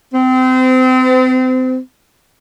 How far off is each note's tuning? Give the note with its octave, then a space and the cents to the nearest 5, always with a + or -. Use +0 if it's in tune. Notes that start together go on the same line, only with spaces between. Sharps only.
C4 -30